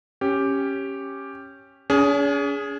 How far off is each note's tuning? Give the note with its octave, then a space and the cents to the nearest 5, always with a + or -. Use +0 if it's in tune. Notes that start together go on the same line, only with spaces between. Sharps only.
C#4 -10 G4 +0
C#4 +45 G#4 +0